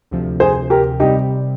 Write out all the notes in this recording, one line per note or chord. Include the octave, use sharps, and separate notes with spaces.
D2 C3 F3
G#4 C5
G4 A#4
C3 G3 C4 D#4 G4